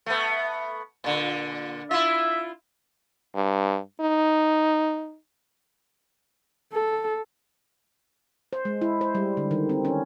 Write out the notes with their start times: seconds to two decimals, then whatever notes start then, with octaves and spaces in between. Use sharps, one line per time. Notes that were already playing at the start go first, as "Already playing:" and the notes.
0.06 A3 B3
1.04 A#2 D3
1.91 E4 F4 E5
3.35 G2
4.01 D#4
6.73 A4
8.53 C5
8.65 G#3
8.81 E4
9.01 C5
9.15 G3
9.37 D3
9.51 D#3
9.69 C4
9.85 C#4